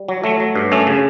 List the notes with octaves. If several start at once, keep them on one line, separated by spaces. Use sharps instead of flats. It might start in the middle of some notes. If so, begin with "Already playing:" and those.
Already playing: G3
F#3
F#3 A3
F#3
G2
F#2 A3 C#4
C#3